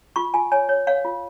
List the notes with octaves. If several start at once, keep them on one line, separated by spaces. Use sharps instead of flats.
F4 C#6
F4 G#5
C#5 G#5
C#5
C#5 F5
F4